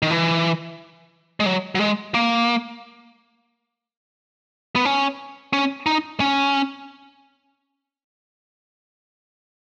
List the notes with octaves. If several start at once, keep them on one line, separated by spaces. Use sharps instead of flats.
D#3
E3
G#3
F#3
F#3
G#3
A#3
B3
C#4
C#4
D#4
C#4